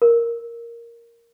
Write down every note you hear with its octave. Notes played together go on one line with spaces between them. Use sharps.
A#4